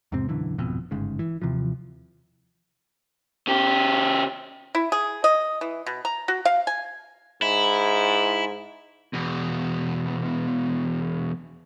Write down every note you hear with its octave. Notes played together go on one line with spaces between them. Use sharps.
E2 G#2 C3 C4
B1 F#2 D3 E3
D#1 G#1 F2 B2
G1 G#2 C#3
E3
D#2 C3 E3 F3
C#3 G4
E4
G#4
D#5
E3
B2
A#5
F#4
F5
G#5
G#2 E4
E2 B2